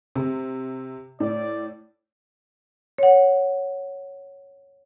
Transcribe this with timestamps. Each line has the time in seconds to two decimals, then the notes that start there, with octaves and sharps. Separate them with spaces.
0.16 C3
1.20 A2 D5
2.98 C#5 F#5